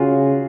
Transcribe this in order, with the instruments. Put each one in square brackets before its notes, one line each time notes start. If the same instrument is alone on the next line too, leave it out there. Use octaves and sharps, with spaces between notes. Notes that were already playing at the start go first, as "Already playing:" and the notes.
Already playing: [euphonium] C#3 [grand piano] F4 F#4 G#4